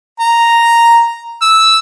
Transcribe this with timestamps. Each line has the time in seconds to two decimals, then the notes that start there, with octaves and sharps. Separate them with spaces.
0.20 A#5
1.41 E6